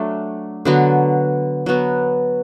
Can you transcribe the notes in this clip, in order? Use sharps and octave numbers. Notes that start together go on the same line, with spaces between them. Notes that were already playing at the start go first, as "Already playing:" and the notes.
Already playing: F#3 A3 D4
D3 F#3 B3 F#4
F#3 B3 F#4